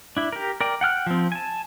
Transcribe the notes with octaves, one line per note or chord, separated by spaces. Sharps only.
D4 E4
G4 A#4
A#4 D5 G5
F#5 G5 F6 F#6
F3 C4
G#5 A5